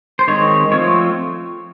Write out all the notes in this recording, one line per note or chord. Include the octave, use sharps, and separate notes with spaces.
C5
D#3 G#3 C4 C#5
F3 A3 C4 C#5